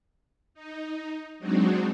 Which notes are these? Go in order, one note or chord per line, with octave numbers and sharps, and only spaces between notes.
D#4
F#3 G#3 C4 D4 D#4 F#4